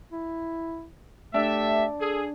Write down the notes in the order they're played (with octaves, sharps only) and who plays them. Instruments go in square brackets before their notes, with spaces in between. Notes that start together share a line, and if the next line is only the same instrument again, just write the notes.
[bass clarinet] E4
[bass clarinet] A3 [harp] D4 [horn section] G4 A4 E5
[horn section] G#4 [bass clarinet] A4